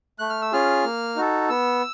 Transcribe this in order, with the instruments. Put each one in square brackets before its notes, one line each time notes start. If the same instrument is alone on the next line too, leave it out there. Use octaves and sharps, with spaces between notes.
[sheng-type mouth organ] A3 F#6
F6
E6
C#4 F4 G#4 F6
A#3
D#4 F#4 A4
B3 E6